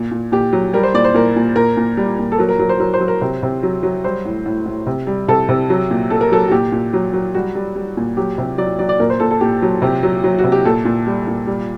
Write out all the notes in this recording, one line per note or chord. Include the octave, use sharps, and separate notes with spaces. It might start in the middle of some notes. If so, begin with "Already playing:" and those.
Already playing: A#2
A#2
A#2 G4
F#3
G3 A#4
C5
A#2 D5
C5
A#2 A#4
A#2
A#2 A#4
A#2
G3
A#2
A4
F#3 A#4
A#4
F#3 A#4
C5
F#3 A#4
C5
F#3
A#4
C3 C5
C3
F#3
F#3
G3 C5
A2
A2
A2
C3
G3
C3 A4
C3
F#3
A#2
A#2 A4
A#4
F#3 A4
F#4
A#2 G4
A#2
F#3
F#3
G3 F#4
G3
G3
A#2
F#3 G4
C3
F#3 D5
F#3 D5
D5
A#2 A#4
C5
A#2 A4
A4
A#2 G4
F#3
C3 G4
F#3
F#3
F#4
C3
G4
A#2 A4
A#2
G3
A#2
G3